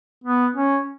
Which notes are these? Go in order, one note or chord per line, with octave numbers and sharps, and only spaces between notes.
B3
C#4